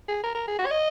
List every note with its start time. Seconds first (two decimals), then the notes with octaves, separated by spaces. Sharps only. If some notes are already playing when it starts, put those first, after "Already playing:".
0.08 G#4
0.24 A#4
0.35 A#4
0.48 G#4
0.59 F#4
0.66 C#5
0.71 D#5